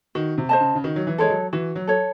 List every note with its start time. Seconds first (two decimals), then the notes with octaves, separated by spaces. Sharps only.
0.15 D#3 F#4
0.38 C3
0.49 C5 D#5 A5
0.60 C#3
0.75 C#3
0.84 D#3 F#4
0.96 F#3
1.07 E3
1.18 G#3 A4 C#5
1.30 F#3
1.53 E3 F#4
1.75 F#3
1.87 A4 C#5